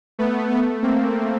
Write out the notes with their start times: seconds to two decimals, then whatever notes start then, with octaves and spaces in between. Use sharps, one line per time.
0.19 A3 B3
0.50 A3 B3
0.83 A#3 C4